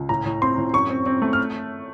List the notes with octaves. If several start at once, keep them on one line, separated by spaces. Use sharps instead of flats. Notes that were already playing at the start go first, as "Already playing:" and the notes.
Already playing: C#2
A2 A#5
A2
C4 C6
A2
F#2 C#6
C4
C4
A3
F6